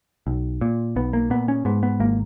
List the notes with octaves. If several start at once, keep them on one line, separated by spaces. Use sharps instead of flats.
B1
A#2
B1 B3
A#3
A#2 B3
C#4
G#2 B3
B3
G#1 A#3